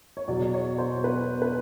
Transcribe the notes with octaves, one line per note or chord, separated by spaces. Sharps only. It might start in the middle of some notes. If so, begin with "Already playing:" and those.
C#5
E2 B2 F#3 D5
C#5
C5
B4
B4